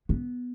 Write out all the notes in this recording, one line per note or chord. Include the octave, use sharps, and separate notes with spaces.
B3